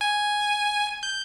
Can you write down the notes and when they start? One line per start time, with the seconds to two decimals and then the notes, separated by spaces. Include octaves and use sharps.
0.01 G#5
1.03 G6